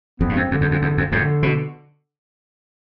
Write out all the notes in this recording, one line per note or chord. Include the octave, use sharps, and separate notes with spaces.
F2 B3
G2
F2 C4
F2 D3
E2
F2
E2
F2
F2 A2 D3
B2